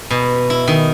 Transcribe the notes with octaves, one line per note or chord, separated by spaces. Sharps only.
B2
E4
D#3